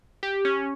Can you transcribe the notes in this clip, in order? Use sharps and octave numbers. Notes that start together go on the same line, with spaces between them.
G4
C#4